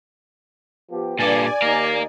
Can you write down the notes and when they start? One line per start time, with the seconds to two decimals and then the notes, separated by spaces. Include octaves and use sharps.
0.90 F3 B3 G4
1.19 G2 A#2 A4 D5 G#5
1.62 D#2 D#4 A#4 F5